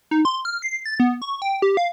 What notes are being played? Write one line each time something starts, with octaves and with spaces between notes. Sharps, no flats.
D#4
C6
F6
C7
A6
B3
C#6
G5
G4
F5